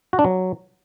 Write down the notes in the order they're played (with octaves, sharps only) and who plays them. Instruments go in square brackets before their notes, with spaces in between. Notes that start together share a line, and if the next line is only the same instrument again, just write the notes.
[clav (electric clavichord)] F#4
D4
F#3